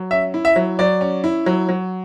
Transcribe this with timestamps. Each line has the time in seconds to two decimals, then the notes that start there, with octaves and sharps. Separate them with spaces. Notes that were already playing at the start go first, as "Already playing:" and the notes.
Already playing: F#3
0.11 C#4 E5
0.34 E4
0.45 E5
0.56 F#3
0.79 F#3 D5
1.01 C#4
1.24 E4
1.46 F#3
1.69 F#3